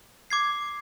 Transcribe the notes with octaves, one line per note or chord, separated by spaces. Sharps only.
D6 G#6 C7